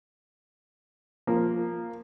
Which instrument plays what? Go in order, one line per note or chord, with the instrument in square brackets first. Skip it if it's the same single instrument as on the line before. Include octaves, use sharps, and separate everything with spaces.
[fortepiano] F3 A#3